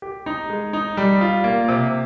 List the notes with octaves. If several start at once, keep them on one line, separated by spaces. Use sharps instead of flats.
G4
D#4
G#3
D#4
G3
F4
A#3
C3